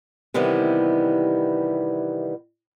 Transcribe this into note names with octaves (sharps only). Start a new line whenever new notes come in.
C3 D#3 E3 G3 B3